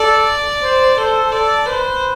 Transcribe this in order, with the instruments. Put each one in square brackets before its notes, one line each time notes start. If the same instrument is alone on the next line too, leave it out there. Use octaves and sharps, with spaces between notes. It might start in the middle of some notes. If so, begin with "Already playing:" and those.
Already playing: [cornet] A4 [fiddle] D5
[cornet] C5
[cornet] A4 [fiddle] C5
[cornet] A4 [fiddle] D5
[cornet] B4 [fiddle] C5